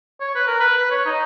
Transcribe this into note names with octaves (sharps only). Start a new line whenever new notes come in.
C#5
B4
A#4
B4
B4
C#5
D#4